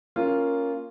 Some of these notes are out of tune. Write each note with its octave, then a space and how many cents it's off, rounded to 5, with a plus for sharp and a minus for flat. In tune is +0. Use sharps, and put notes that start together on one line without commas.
A#3 +0 C#4 +0 F4 -5